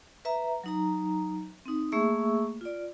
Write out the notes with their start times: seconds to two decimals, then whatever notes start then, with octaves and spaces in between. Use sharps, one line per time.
0.25 B4 E5 A#5
0.64 F#3 D#4 A#5
1.65 C4 D#4
1.92 A3 A#3 G#4 E5 C#6 E6
2.61 F4 D5